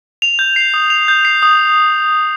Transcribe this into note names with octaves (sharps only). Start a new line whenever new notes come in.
F7
G6
C7
D#6
F7
G6
C7
D#6